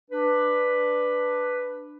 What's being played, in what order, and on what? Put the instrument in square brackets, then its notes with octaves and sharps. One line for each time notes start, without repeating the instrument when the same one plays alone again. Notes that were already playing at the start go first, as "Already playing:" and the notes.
[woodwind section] D4 B4